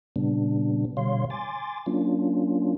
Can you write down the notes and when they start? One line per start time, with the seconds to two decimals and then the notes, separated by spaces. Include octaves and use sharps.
0.16 A#2 C#3 G3 B3 D4
0.97 B2 D3 G3 C#5 F5 C6
1.30 G#5 C6 D6 A6
1.86 F#3 A#3 C#4 D4 F4